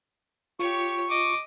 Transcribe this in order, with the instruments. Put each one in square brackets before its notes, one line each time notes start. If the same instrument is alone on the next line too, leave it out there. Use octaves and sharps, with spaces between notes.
[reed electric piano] F4 [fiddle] G4 C#5 [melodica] C#6
[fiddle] D#5 [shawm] D6